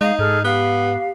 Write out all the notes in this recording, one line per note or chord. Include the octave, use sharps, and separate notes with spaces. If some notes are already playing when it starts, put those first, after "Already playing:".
G#3 D#4 F5
G#2 G#4 A4 F6
B3 G4 F5